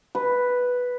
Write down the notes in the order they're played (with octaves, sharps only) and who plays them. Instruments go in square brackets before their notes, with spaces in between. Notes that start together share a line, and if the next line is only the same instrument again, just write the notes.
[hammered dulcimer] B4